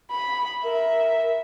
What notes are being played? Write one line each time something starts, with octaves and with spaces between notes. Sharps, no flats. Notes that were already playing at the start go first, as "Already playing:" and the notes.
B5
A#4 E5